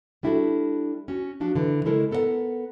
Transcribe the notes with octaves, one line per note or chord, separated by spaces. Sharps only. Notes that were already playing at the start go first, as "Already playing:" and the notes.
G3 D4 E4 F#4 G4 A4
C#4 F#4
F3 D4 F#4
D3 E3
C#3 G#3 E4 A4 A#4
B3 A4 A#4 D5 F#5